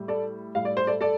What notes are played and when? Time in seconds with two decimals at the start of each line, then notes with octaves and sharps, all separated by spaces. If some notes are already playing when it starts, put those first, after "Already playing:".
Already playing: A2 G3
0.08 A4 D5
0.55 A2 G3 F5
0.65 D5
0.77 C5
0.87 A4 D5
1.01 A4 D5